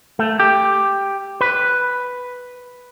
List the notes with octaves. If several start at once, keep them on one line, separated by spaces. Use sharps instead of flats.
A3
G4
B4